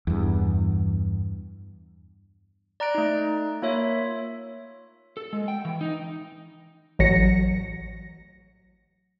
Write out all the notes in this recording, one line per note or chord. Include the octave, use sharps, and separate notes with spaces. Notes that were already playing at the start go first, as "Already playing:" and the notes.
E2 G2
D5 A#5 F#6 D7
A3 D#4
A#3 F4 C#5 E5
A4
G#3
G5
E3
D#4
A1 F#3 A#6 C#7